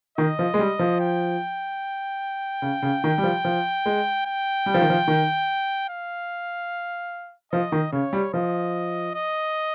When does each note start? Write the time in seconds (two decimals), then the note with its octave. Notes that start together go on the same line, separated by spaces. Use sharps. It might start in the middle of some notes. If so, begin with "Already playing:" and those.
0.18 D#3 D#5
0.39 F3
0.54 G#3
0.59 G3
0.79 F3
1.00 G5
2.62 C#3
2.82 C#3
3.04 D#3
3.18 G3
3.24 F3
3.45 F3
3.86 G#3
4.26 G5
4.66 G3
4.74 F3
4.81 D#3
4.90 F3
5.08 D#3
5.89 F5
7.52 F3 D#5
7.72 D#3
7.92 C#3 C#5
8.13 G3
8.34 F3 D#5
9.15 D#5